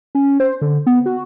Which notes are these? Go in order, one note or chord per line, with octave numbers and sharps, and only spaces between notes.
C#4
C5
D3
B3
F#4